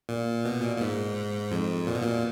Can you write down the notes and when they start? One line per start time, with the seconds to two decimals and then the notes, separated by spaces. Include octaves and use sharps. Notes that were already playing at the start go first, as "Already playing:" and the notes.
0.09 A#2
0.45 B2
0.62 A#2
0.76 A#2
0.81 G#2
1.51 F2
1.87 A#2
1.95 B2
2.02 A#2